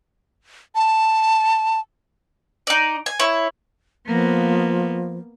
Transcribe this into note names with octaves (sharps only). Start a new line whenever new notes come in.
A5
D#4 D5
G#5
E4 C#5
F3 A#3 B3